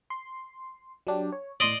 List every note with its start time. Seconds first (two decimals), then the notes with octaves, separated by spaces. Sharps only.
0.10 C6
1.07 F#3 D4 G4
1.32 C#5
1.60 A2 D5 D#5 C6 D#6